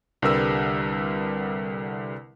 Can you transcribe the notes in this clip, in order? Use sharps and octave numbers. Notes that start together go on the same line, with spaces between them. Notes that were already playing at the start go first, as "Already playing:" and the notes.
C2 D3 G3 A#4 B4 E6